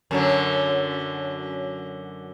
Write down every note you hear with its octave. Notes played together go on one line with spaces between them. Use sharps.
F#2 D3 F#3